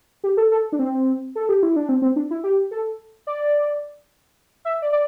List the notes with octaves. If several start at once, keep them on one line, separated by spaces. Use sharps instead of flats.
G4
A4
A4
D4
C4
A4
G4
E4
D4
C4
C4
D4
E4
G4
A4
D5
E5
D5
D5